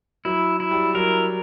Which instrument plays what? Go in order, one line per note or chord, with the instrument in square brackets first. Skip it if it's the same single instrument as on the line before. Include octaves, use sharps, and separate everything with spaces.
[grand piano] F#3 [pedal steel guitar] E4
[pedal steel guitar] E4
[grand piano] G3
[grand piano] F#3 [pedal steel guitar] A#4